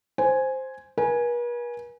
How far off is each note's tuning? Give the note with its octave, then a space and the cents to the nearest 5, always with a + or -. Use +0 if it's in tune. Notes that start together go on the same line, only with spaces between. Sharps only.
C5 +0 G#5 +0
B4 -45 G#5 +0